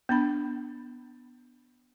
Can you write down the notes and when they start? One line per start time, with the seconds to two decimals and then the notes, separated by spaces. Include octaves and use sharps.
0.09 B3 D4 B5